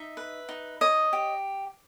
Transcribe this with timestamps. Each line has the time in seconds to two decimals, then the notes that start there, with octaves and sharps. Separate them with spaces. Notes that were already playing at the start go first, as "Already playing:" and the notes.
Already playing: D#4 E5
0.17 B4
0.49 D#4
0.81 C#5 D#5
1.13 G4